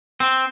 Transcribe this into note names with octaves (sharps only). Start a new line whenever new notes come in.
C4